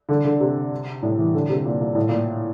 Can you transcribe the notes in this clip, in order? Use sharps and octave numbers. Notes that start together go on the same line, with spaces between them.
D3
D3
C3
A2
E3
D3
C3
A#2
A#2
A2
A#2